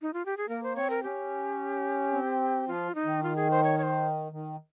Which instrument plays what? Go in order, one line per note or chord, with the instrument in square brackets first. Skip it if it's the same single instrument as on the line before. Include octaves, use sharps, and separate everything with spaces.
[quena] D#4
F4
G4
G#4
[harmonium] A#3 [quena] A#4
[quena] C5
[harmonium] C4 [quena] C#5
[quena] A#4
[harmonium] C#4 [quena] G4
[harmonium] C4
[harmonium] F3 [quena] F4
[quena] D#4
[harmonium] D#3
[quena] F4
G#4
C5
C#5
C#5
C5
[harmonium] D#3